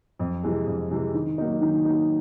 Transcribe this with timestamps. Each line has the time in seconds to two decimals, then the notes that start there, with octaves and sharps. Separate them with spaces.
0.19 F2
0.43 C3 E3 G#3
0.67 F2
0.91 C3 E3 G#3
1.14 D#3
1.38 F#3 A#3 D#4
1.62 D#3
1.85 F#3 A#3 D#4